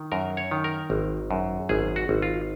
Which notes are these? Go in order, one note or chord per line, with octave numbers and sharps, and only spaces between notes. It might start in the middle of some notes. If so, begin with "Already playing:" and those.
Already playing: D#3
F#2 A#4
C#5
D#3
A#4
G#1
F#2
G#1 G#4
F#4
G#1
F4